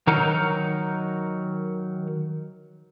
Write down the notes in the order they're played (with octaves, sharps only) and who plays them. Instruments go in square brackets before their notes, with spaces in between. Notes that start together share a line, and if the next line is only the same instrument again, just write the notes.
[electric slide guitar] D#3 F#3 D#4 A#4 F#5 A#5